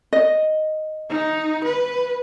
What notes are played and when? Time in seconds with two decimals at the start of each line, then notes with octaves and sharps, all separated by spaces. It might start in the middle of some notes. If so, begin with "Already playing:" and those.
0.13 D#5
1.10 D#4
1.64 B4